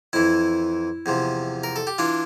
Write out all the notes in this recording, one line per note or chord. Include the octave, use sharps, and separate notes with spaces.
F2 E3 E4
E2 C3 F3
A#4
A4
G4
E3 D4 F4